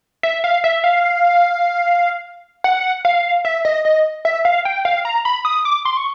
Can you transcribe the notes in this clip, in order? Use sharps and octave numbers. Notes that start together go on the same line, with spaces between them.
E5
F5
E5
F5
F#5
F5
E5
D#5
D#5
E5
F5
G5
F5
A#5
B5
D#6
D6
C6
C#6